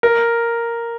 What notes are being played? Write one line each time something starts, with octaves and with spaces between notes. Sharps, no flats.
A#4